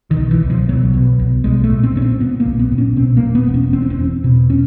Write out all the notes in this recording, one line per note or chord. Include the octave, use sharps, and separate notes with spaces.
D#3
B1
E3
B1
F3
B1 F#3
B2
B1
B1 G#3
A3
A#2
C4
A#2 C#4
C4
A#2 B3
A#3
B1
B3
A#2
C#4
B2 C4
A#3
E1
B3
E1
C#4
E2 C4
C#4
C4
E2
B2
C#4